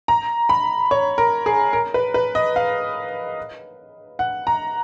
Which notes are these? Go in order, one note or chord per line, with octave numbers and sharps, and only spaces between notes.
A#5
B5
C#5
A#4
G#4
A#4
B4
B4
D#5
F5
F#5
A#5